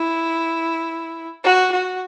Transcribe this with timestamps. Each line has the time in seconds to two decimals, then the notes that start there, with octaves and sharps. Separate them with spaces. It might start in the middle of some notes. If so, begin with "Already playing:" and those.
Already playing: E4
1.44 F#4
1.72 F#4